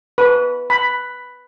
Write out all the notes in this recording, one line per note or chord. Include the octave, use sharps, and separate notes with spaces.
B4
B5